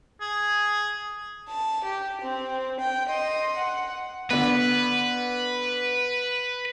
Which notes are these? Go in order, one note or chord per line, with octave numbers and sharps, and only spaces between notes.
G#4
A5
G4
C4
G5
D#5 C6
F#5
D3 B3 B4